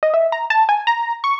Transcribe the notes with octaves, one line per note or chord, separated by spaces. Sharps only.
D#5
E5
A#5
A5
G#5
A#5
C#6